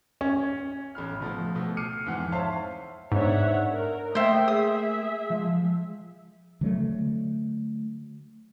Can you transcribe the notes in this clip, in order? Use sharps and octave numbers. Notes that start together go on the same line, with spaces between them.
C#4
A1 B5 F6
B2 F3 A3
B2 A3
D6 F6 C7 C#7 D#7
F2 G#2 E3 F#5 F6
C5 C#5 E5 F5 A5
G#2 B3 D4 C#5 E5 F#5
A#4
A3 A#3 C5 D#5 E5 G5
G#4 E5 D#6
F3 G#3
D3 F#3 G#3 A3